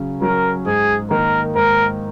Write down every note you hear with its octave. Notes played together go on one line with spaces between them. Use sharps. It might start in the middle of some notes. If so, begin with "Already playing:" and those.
Already playing: C#3 F#3 C#4
F#3 C#4 A#4
G#2 G#4
D#3 A#3 A#4
G#2 A#4